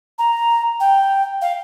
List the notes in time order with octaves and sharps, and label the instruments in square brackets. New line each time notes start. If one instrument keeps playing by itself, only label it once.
[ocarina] A#5
G5
F5